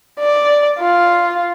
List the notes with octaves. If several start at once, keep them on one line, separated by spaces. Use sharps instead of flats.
D5
F4